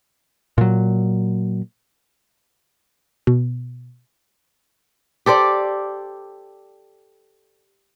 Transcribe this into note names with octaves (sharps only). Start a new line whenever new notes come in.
A#2 F#3
B2
G4 A4 C5 D5